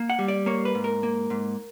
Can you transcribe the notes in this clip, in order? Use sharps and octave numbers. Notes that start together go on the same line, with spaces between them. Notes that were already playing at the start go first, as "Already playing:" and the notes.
Already playing: A#3
F#5
G3
D5
A#3 C#5
B4
G#2
A#4
A#3
G#2